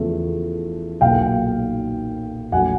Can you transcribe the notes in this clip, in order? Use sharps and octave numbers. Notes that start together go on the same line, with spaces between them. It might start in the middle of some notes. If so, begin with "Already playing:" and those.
Already playing: E2 C#3 F3 A3
B1 A#2 F#3 A#3 F5 G5
A#1 A#2 F#3 A3 F#5 G#5